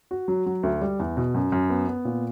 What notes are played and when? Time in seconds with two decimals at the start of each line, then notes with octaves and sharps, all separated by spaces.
0.11 F#4
0.28 F#3
0.46 F#3
0.63 D2
0.81 G3
0.99 E2
1.17 B2
1.34 F#2
1.52 F#2
1.70 B3
1.87 B3
2.05 A#2